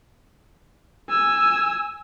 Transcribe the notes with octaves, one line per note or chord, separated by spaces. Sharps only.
G#5 E6